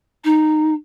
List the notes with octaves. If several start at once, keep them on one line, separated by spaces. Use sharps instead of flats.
D#4